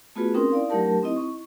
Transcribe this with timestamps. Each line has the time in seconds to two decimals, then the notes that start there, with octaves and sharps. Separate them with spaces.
0.16 A3 B3 F4 F#4 G#4 B4
0.34 C4 C#4 D#4 A#4 G5 C6
0.52 D#4 E4 D5 F5
0.70 F#3 A3 D4 G4 A#4 A5
1.03 C4 D#4 E4 D#5
1.16 C#6